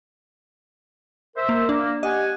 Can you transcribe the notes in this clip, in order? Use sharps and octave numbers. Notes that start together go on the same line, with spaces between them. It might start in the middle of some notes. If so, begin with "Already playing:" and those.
A#4 C5 E5
A#3
A#3 D4
G4 D#5 F#5 G#5